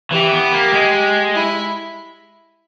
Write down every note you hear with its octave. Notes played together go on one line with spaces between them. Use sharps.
E3 G4
B3
A#3
G#3
E4